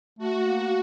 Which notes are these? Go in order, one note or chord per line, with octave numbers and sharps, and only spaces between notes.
A3 F#4
A#3